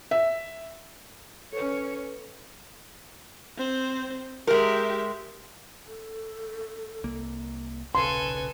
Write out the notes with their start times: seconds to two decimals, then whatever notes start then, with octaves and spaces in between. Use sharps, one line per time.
0.11 E5
1.53 C#4 A4 B4 C#5
3.58 C4 C5
4.47 G#3 G4 A#4 E5
5.87 A4
7.04 C2 A#3
7.95 D#1 B1 C#3 A4 B4 G#5 C6